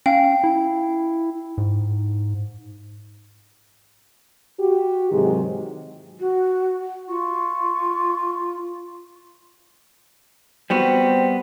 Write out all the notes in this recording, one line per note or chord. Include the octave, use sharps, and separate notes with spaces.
C#4 F5 G5
E4
G#2
F#4 G4
G#2 C3 D#3 E3 F#3 G#3
F#4
F4 C#6
G3 B3 C4 F#4